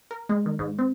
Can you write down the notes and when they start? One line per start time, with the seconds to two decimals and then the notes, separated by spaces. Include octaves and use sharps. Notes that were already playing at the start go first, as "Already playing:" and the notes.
0.11 A#4
0.29 G#3
0.46 D#3
0.59 G#2
0.78 C4